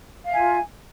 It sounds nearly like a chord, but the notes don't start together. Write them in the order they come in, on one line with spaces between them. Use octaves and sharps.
F5 E5 G#5 F4